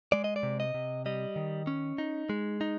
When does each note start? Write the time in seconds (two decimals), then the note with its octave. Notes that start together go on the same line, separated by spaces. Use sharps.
0.12 G#3 D5
0.24 D#5
0.36 D5
0.43 C3
0.60 D#5
0.74 C3
1.06 G3 D#5
1.36 D#3
1.67 C#4
1.98 D#4
2.29 G#3
2.61 D#4